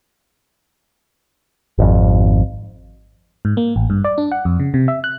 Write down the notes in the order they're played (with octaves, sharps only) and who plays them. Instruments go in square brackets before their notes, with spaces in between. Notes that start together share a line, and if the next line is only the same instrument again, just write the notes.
[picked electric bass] G#1 F2
[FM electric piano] G#2
A#3
A1
G2
D5
D4
F#5
F2
C#3
C3
E5
F#6